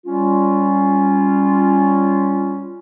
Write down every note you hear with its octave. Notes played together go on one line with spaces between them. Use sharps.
G3 C#4 F4